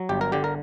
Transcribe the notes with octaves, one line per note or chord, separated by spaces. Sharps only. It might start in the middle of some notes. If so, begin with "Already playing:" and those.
Already playing: F#3
G1 G4
A#4
D3 G4
A#4